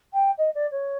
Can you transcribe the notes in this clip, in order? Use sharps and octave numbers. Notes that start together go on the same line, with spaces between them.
G5
D#5
D5
C#5